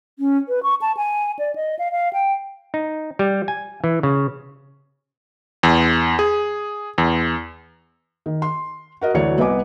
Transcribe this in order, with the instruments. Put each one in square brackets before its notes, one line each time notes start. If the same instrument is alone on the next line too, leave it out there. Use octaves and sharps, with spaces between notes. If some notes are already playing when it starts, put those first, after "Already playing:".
[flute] C#4
B4
C#6
A5
G#5
D5
D#5
F5
F5
G5
[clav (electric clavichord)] D#4
G3
G#5
E3
C#3
[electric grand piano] E2
G#4
E2
[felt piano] D#3
C6
F#4 A#4 D#5
D2 E3 F#3 C#5 D5 C#7
C2 B3 B4 D#5 G#5 D6